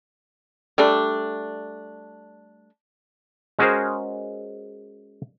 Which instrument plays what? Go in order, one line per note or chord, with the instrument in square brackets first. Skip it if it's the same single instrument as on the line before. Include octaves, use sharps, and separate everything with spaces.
[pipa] G3 A3 D4
[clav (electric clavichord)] G#3 C#4 F#4 G#4 A#4 C5